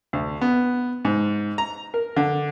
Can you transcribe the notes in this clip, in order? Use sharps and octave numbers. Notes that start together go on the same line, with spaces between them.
D2
B3
G#2
A#5
A#4
D3